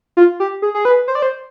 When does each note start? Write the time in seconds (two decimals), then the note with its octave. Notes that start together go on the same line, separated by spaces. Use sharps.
0.17 F4
0.40 G4
0.62 G#4
0.75 G#4
0.85 B4
1.08 C5
1.15 D5
1.22 C5